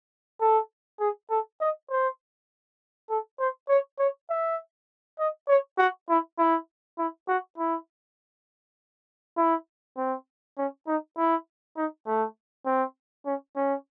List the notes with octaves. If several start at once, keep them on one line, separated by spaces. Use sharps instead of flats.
A4
G#4
A4
D#5
C5
A4
C5
C#5
C#5
E5
D#5
C#5
F#4
E4
E4
E4
F#4
E4
E4
C4
C#4
D#4
E4
D#4
A3
C4
C#4
C#4